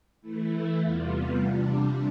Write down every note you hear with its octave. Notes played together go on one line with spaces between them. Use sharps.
E3 A3 E4
E2 C3 G3 B3 F4
C3 G3 D4